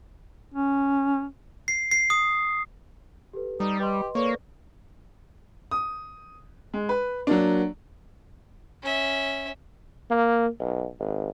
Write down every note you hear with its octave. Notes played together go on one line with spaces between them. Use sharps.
C#4
C7
C7
D#6
G4 A4 B4
G3 D#4
G4 B4 D#5 C6
A#3 A4 B4 C#5 D5
D#6
G#3
B4
F#3 A#3 D4
C#4 E5
A#3
B1
G#1